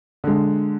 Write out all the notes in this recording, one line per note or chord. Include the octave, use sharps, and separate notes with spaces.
D3 G#3